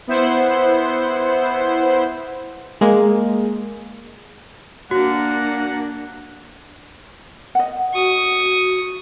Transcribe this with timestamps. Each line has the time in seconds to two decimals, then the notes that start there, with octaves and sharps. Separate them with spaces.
0.07 B3 E4 C5 F#5
2.81 G#3 A#3
4.91 A#3 D4 F#4 F#5
7.55 D#5 F#5
7.94 F#4 C#6 D#6